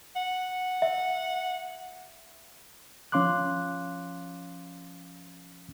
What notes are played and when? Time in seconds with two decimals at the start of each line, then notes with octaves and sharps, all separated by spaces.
0.16 F#5
0.82 E5
3.12 F3 C#4 F5 C6 D6 F#6